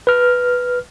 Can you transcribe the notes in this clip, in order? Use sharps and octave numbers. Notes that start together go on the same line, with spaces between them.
B4 F6